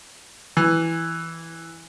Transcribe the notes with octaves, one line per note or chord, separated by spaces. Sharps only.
E3